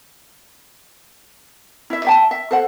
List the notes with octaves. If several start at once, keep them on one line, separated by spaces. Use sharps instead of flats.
E4 E5
E5 G5 A5
E5
A4 C5 F#5